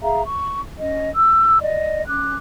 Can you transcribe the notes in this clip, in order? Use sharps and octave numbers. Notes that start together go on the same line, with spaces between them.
G#4 E5 F5 A#5
C#6
C#4 D#5
E6
D5 D#5
C#4 D6 F#6